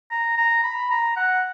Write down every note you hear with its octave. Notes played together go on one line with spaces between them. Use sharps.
A#5
A#5
B5
A#5
F#5